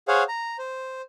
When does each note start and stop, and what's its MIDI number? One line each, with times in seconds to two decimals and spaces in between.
0.08 0.23 68
0.08 0.23 72
0.08 0.23 73
0.08 0.23 77
0.08 0.23 78
0.29 0.57 82
0.59 1.02 72